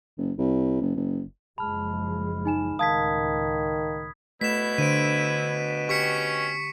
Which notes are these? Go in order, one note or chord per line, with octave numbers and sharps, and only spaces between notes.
F#1
C2
F#1
F#1
F#1 F3 G#3 A5 B5 F6
D#4 G#5 E7
C#2 A2 D#3 F5 A5 D#6 G#6 B6
B2 A3 E4 B6 E7
D3 C5 D7 D#7
C#4 G4 C#6 B6 C#7